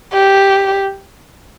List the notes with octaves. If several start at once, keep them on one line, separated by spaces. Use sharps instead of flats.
G4